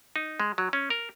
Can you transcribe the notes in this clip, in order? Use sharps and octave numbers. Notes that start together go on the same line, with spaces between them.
D#4
G#3
F#3
C#4
A#4